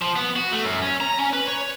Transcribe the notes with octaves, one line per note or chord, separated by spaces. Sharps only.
F3
B3
F#4
A3
F#2
C#4
A#5
C#4
B4
C#5